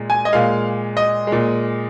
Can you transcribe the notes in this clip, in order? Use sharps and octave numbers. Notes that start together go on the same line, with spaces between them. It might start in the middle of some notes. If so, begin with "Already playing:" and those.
Already playing: A#2 G#3
G#5
D#5
A#2 G#3 F5
D#5
A#2 G#3